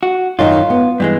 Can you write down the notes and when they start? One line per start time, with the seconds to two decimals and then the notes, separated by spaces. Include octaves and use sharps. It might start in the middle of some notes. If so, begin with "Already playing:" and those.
0.03 F#4
0.39 F#2 D#3 D#4 F4
0.70 B3
1.00 G2 E3 G#3